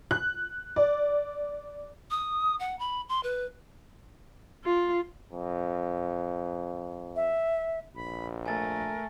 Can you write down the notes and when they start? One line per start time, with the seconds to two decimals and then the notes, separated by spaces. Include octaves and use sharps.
0.11 F#6
0.76 D5
2.11 D#6
2.60 F#5
2.79 B5
3.09 C6
3.23 B4
4.64 F4
5.32 F2
7.16 E5
7.96 A#1 B5
8.46 A3 A#4 G#5 A6